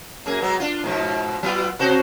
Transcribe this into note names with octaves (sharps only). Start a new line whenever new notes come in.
F#2 A#3 G#4
F#3 G#3 B3
D4 F4
G#2 B2 F3
F#3 B3 F4
C3 F#4 C5